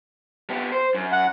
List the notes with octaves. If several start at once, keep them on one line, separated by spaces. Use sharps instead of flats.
B3 G4
C5
F#2
F#5